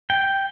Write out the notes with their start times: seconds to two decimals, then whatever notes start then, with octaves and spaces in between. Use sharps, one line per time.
0.10 G5